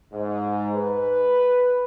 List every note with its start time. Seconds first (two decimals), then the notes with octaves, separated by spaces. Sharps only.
0.12 G#2
0.76 B4